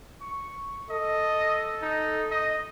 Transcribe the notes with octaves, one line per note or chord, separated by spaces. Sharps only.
C#6
A4 D#5
D#4
D#5